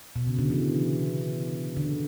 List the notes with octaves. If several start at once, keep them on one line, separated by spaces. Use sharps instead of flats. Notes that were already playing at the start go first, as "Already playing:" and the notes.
B2
C#3
D3
E3
D3